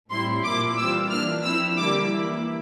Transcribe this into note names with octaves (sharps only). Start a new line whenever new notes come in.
A2 G3 C4 E4 C6
A#2 F3 A#3 E4 D6
E3 G3 C4 F4 E6
E3 A#3 D4 F6
F3 C4 E4 E6
D3 G3 A#3 E4 D6
E3 A#3 E4